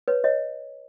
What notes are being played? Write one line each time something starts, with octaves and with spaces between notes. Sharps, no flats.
B4 C#5
C#5 D#5